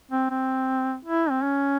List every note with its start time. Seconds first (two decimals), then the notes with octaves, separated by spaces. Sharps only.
0.11 C4
0.30 C4
1.05 E4
1.30 C4
1.42 C#4